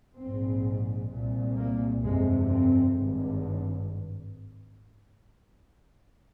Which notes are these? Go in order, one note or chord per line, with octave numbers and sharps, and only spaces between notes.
A#1 G#2 C4
C2 A#2
A#3
G1 F2 C3 G#3
C4
G#1 G2